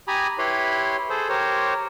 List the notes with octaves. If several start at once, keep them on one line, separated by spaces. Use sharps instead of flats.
G4 G#5 A#5 B5 D#6
E4 G4 B4 C#5 B5 C6
G#4 A4 C5
G4 A#4 C5 C#5